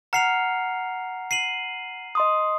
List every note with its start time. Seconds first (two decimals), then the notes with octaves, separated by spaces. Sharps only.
0.13 F#5 A#5 F6 C7 C#7 F7
1.31 C7 D#7 F#7
2.15 D#5 C6 D#6